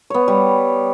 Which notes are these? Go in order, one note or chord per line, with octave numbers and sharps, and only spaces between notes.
B3 C#5
G3